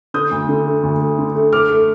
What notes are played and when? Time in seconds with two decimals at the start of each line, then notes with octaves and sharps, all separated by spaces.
0.14 D3 D#6 G6
0.31 D2
0.49 D3
0.66 A3
0.83 D2
1.00 A3
1.19 D3
1.35 A3
1.53 A3 D6 F6
1.70 A3